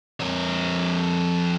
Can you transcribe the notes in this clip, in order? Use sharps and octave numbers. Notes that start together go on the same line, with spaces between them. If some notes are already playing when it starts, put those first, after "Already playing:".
F2 C#5